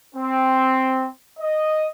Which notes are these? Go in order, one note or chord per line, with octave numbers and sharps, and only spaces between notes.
C4
D#5